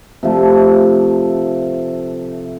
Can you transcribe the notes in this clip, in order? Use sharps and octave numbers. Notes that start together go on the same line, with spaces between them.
C3 F3 A3